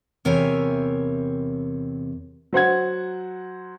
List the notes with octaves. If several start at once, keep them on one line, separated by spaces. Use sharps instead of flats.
E2 C3 A#4 C#5 E5 G#5
F#3 C5 F#5 G#6